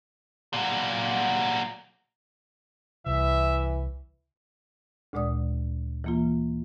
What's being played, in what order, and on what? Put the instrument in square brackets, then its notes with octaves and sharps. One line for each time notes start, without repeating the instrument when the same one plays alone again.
[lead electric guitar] A#2 F#3
[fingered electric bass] C2 [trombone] E3 [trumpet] E5
[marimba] D2 A#2 G#3 D5 D#6
E3 A#3 F4